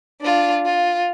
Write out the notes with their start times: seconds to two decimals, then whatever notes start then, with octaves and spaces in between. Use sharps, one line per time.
0.21 D4 F4
0.66 F4